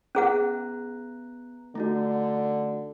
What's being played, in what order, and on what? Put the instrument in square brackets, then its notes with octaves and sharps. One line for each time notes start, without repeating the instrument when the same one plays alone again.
[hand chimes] B3 A#5 F#6 [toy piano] C#4 G#4 F#5
[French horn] D3 [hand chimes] A3 D#4 F#4